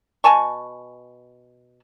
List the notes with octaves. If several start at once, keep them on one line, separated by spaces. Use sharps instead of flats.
B2 G#5 A5 C#6